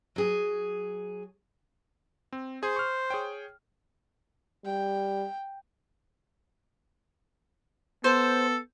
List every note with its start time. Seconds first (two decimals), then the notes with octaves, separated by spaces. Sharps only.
0.16 F#3 G#4
2.33 C4
2.63 G#4 C5 G#5
2.76 C#6 F6
3.10 G#4 C#5 G5
4.65 G3 G5
8.04 B3 A4 C5